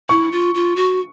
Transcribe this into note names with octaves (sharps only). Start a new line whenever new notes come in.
E4 C#6
F4
F4
F#4